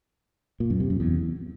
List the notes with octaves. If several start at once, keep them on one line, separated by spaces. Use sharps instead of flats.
A#2
F#2
C3
F#2
E2